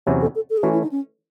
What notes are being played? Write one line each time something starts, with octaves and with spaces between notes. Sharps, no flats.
E2 C3 F#3 C#4 E4 C5
A4
A4
A4
G#4
E3 A3 C#4 F#4
E4
D#4
C#4